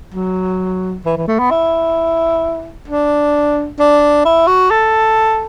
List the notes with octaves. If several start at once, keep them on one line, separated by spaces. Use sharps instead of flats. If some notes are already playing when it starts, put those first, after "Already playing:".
F#3
E3
E3
A3
B3
E4
D4
D4
E4
F#4
A4